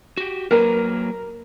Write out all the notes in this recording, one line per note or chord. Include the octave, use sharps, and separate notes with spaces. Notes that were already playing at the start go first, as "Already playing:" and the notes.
F#4 G4
F#3 A#3 A#4 B4